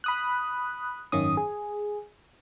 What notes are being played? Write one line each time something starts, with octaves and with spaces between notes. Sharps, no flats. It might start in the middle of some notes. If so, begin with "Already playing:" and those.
B5 D#6 F#6
G#1 F#2 D#3 C#4 D#6
G#4